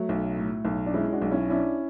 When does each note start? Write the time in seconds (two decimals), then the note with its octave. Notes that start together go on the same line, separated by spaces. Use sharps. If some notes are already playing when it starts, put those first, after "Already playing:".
Already playing: F#3 A3
0.09 B1
0.37 A2
0.65 B1
0.86 D4
0.94 G#3 C#4 E4
1.12 D4 F#4
1.22 B1
1.30 C#4 E4
1.49 C#4 D4 E4